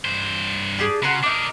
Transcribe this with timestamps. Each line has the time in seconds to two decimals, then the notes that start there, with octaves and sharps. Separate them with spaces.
0.05 G2 C5
0.78 D4 G4 G#4
1.03 C#3 F#4 A#4 C6
1.23 D4 D#4 A#4 D6